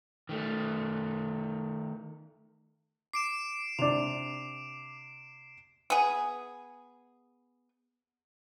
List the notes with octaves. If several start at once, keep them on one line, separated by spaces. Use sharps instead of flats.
D#3 A3
D6 C7 D7 E7
C3 D4 D6 F7
B3 G#4